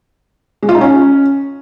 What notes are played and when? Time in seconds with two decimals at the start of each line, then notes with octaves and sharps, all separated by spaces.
0.63 G#3
0.69 F4
0.75 D#4
0.81 C#4